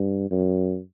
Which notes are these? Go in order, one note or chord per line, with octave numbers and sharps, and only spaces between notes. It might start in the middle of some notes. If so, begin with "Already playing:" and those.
Already playing: G2
F#2